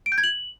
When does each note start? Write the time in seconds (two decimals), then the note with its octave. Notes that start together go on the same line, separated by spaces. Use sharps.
0.06 D7
0.12 G6
0.18 G#6
0.23 F#7